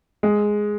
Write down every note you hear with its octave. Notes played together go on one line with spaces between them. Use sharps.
G#3